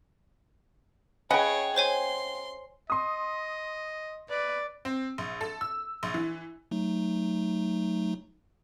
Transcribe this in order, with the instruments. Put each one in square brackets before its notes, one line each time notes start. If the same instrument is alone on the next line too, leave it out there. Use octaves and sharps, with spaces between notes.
[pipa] C#3 B4 D#5 [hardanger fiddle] G#4 C#5 [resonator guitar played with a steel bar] F#5 G5
[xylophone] C5 C#5 G#5 [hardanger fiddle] C6
[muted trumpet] D#5 [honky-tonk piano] C6 D#6
[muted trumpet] B4 [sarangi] D5
[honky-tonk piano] C4
A#1
A4
E6
A#1
E3
[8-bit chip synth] F#3 A3 D#4